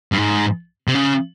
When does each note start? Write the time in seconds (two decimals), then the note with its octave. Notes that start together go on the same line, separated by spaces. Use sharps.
0.12 G2
0.18 G#2
0.88 C3
0.95 C#3